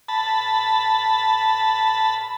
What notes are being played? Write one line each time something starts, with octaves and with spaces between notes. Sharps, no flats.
A5 B5